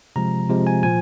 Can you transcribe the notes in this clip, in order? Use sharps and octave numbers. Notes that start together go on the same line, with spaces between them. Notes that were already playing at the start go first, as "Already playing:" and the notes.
C3 F3 G#3 A#5
C3 F3 G#3
G#5
A#2 F3 G#5